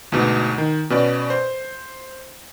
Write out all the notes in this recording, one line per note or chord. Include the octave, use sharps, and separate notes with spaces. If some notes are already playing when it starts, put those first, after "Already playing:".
D2 G#2 B2
D#3
B2 C#4 B4 D5
C5